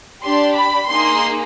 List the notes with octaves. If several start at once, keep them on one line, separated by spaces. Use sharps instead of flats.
D4 G4 C6
B5
A#3 D#4 G#4 C6